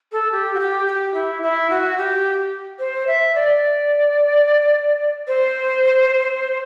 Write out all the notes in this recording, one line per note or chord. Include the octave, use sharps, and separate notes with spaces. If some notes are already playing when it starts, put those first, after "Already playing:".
A4
G4
F#4
G4
G4
E4
E4
F#4
G4
C5
E5
D5
C5